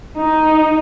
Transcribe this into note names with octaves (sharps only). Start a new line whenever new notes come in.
D#4